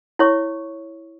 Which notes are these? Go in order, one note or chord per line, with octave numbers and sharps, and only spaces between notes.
E4 C#5 C#6